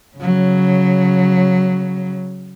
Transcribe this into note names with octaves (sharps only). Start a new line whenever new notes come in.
C#3 F#3